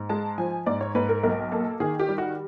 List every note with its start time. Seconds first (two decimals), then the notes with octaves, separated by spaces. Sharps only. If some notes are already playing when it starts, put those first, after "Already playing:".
Already playing: G#2
0.09 G#3 A5
0.38 F3 G#5
0.66 G#2 D5
0.81 C#5
0.95 G#2 B4
1.09 A#4
1.23 B1 A#4
1.52 A#3 A4
1.80 D#3 G#4
1.99 G4
2.09 G3
2.18 F#4